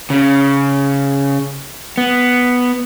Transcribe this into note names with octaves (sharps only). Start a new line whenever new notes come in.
C#3
B3